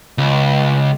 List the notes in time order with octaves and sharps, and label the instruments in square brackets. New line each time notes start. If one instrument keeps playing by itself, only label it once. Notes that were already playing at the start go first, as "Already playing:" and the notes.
[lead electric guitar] C#2